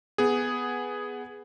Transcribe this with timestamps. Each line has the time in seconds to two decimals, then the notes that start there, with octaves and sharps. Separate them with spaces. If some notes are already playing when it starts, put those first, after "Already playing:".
0.18 B3 G#4